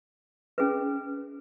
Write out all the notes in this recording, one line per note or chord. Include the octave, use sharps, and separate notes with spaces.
C#4 G#4 B4